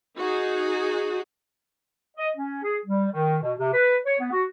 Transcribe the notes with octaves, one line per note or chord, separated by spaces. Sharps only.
D#4 F#4 G#4
D#5
C#4
G#4
G3
D#3
B2
C3
B4
C#5
B3
F#4